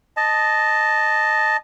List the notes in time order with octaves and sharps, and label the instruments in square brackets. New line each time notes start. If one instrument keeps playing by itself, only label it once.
[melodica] D#5 A5